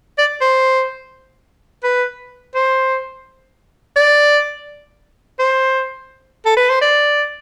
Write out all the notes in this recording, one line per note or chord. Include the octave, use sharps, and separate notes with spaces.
D5
C5
B4
C5
D5
C5
A4
B4
C5
D5